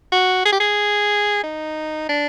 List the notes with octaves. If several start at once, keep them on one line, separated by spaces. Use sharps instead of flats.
F#4
G#4
G4
G#4
D#4
D4